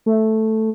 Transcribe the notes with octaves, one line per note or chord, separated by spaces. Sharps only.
A3